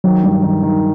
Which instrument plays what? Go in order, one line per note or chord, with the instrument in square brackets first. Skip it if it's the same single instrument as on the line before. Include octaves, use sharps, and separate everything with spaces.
[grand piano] D#3 [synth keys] F#3
[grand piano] G2
D#3
D#3